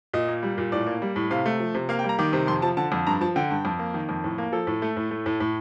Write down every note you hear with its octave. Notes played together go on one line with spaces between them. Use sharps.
A#2 D#5
A#3
G3
A#2
A2 D5
A#3
G3
A2
C3 F5
A3
F3
C3
A#3 F5
G5
G3
A#5
D#3 D6
C3
F2 C6
F3 A5
D3 A5
F2
G2 A#5
F3 A5
D3 G5
G2
F2
A#3
D#3
F2
A2
A#3
F3 A4
A2
A3
A2
A3
A2
A2